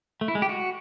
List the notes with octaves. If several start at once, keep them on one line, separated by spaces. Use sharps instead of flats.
A3
E4
G#3
G4
F#4